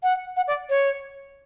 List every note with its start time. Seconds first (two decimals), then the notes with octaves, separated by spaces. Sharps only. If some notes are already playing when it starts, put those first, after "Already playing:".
0.03 F#5
0.36 F#5
0.47 D5
0.69 C#5